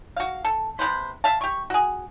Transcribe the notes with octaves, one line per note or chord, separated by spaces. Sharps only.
F#4 F5
A4
C3 G#3 B4 C5
E5 F5 A5
G4 C#6
F#4 G#4